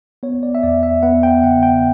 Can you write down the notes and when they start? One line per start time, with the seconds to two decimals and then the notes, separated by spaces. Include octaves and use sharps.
0.23 B3 C#5
0.43 D5
0.55 E5
0.63 E2 D5
0.83 E5
1.03 B3 F#5
1.23 G5
1.43 C#3 F#5
1.63 G5